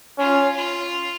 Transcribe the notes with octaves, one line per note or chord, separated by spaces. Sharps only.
C#4 F4
F4